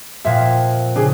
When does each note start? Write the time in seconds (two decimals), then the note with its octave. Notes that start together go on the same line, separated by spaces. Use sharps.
0.25 F2 A#2 E5 F5
0.96 C#3 D4 G#4